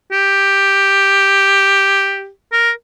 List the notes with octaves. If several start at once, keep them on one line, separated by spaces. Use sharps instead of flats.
G4
A#4